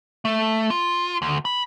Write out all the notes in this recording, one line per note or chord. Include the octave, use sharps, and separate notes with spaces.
A3
F4
D2
B5